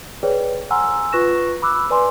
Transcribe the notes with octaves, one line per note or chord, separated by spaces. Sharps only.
G#4 B4 C#5 D5 G5
F#5 G#5 A#5 C6 E6 F6
F4 B4 C#6 F#6 A#6 E7
B5 D6 E6 F#6
B4 D5 G#5 C6 D6